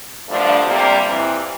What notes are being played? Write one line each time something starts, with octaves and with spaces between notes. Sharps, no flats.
G2 D3 F3 A3 D4
C3 G3 A#3
F2 C3 E3